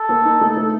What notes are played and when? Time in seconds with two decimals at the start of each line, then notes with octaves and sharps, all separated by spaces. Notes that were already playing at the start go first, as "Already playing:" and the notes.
Already playing: A4
0.09 A#3
0.25 D#4
0.41 A3
0.57 A3